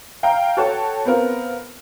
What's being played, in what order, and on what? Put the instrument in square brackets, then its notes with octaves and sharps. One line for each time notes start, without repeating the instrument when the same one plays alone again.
[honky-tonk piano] F5 G5 A#5
F#4 A4 C#5 G5 A5
B3 C4 F4 A#4